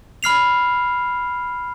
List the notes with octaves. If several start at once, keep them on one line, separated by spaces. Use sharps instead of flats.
B5 F6 C7 F7